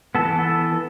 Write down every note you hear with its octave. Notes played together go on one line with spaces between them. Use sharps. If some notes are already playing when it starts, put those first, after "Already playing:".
E3 B3 A4